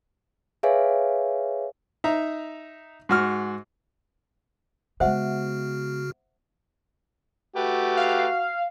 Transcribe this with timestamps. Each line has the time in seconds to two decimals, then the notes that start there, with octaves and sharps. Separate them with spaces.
0.63 G#4 B4 C#5 E5 F5 G#5
2.04 D#4 E5 A#5
3.09 G#2 F#4 F6
5.00 C#3 G#3 B3 F#4 C5 E5 F#5 F6
7.56 A3 F#4 G4 B4
7.97 F5